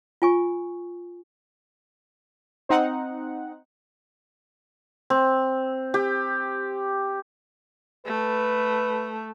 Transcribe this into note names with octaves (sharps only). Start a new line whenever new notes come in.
F4 G#5 C#6
C4 D#4 F#5
C4
G4
A3 B4